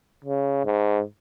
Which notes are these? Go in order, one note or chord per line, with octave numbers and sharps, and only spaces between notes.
C#3
G#2